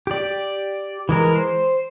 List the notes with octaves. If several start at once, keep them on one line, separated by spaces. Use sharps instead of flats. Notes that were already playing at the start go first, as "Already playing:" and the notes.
G4 D5
E3 G#3 A#4
C5